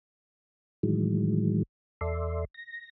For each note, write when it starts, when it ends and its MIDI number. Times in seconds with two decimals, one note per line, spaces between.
0.83 1.63 45
0.83 1.63 51
0.83 1.63 52
0.83 1.63 54
0.83 1.63 56
2.01 2.45 40
2.01 2.45 69
2.01 2.45 74
2.01 2.45 76
2.01 2.45 84
2.54 2.89 94